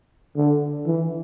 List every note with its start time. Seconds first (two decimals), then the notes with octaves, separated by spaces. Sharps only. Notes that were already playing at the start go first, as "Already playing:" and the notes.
0.36 D3
0.86 E3